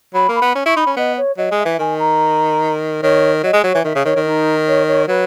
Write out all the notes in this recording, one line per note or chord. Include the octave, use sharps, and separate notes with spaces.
F#3 B5
A#3
B5
B3
C#4
E4 C#6
D#4 B5
C#4
B3 D#5
C#5
F#3 D#5
G#3
E5
E3
D#3 G#5
A#5
D#3 C#5
F#3 D#5
G#3
F#3 C#5
E3
D#3 E5
C#3
D#3 C#5
D#3
D#4
C#5
C#5
F#3 B4